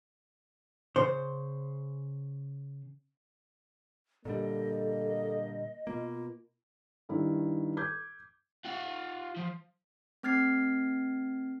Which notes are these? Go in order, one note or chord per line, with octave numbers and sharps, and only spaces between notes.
C#3 C5
A#2 D3 G3 A#3 A4 D#5
B2 A#3 F4
G2 D#3 E4
D6 G6 G#6
F4 F#5
F3
A3 C4 F6 G#6 A6 C7